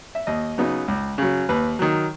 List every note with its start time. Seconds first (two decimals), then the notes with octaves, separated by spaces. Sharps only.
0.15 E5
0.27 D#2 D#5
0.58 C#3 F#3 B3 D#4
0.88 C#2
1.18 C#3 F#3
1.49 D#2 B4
1.79 D#3 F#3